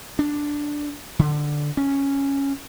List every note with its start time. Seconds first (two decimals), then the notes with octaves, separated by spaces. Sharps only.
0.19 D4
1.19 D3
1.77 C#4